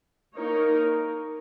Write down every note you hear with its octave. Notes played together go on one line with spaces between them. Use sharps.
A#3 D#4 A#4 C#5